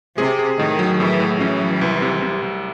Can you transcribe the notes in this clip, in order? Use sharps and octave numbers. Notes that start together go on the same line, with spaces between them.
C3 G#4
G#4
A2 D#3
F#3
A2 E3
A2
E3 C#4
F#3
C2
C3
C3
C2